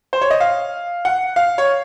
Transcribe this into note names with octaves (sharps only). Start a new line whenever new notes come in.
C5
C#5
D#5
F5
F#5
F5
C#5